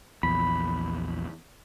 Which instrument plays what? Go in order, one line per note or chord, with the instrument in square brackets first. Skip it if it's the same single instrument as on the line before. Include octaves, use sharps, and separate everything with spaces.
[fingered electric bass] A#1 E2 [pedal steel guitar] B5